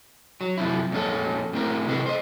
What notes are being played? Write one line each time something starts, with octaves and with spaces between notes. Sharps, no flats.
F#3
F#2 C3 F3 E4
F2 A#2 G#3 C#4 A4
A2 C4 A#4
C3 E3 G#3 A4 B4
C5 D#5